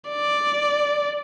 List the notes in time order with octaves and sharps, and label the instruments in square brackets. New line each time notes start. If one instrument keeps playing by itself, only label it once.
[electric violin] D5